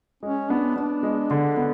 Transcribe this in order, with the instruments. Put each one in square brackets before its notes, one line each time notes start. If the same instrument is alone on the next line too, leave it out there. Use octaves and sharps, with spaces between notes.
[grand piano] G#3 [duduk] C#4
[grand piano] B3 [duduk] D4
[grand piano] B3 [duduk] D4
[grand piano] G#3
D3
B3